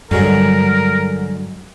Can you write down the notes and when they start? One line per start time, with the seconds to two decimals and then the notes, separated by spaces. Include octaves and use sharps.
0.11 G2 D3 F#3 G#3 A#4